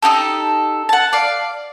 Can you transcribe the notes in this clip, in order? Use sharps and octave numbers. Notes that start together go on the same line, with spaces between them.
D#4 E4 G4 A4
F#5 A5
D5 F5